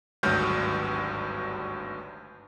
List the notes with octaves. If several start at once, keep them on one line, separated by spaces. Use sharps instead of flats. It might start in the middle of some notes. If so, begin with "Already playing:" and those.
G#1 D2 G2 F#3 F6 G6